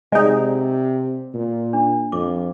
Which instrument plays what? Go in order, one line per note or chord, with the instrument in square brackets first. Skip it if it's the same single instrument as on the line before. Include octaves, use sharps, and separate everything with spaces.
[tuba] C3 [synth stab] G#3 D#4 [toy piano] D5 F#5 G#5
[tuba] A#2
[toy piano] D4
[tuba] F2 [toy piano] D6